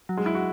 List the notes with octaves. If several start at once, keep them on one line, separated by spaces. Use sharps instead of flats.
F#3
G#3
E4
F#4